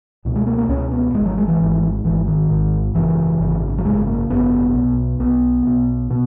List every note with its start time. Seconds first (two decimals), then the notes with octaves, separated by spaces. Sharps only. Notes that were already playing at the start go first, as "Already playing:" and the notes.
0.25 C#2 B2
0.36 G#3
0.46 A#3
0.58 A#3
0.69 C#2 B2 C#4
0.92 B3
1.14 G#2 G#3
1.18 G#1
1.26 F#3
1.37 G#3
1.48 E3
1.59 G#1 G#2
2.04 G#1 G#2 E3
2.28 D#3
2.49 G#1 G#2
2.94 G#1 F#2 C#3 E3
3.40 G#1 F#2 C#3
3.78 F#3
3.85 G#1 F#2 C#3 G#3
4.07 A#3
4.30 G#1 F#2 C#3 B3
4.74 B1 B2
5.19 B1 B2 B3
5.65 B1 B2
6.10 B2 B3